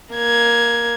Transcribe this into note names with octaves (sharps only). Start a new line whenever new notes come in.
A#3 G#6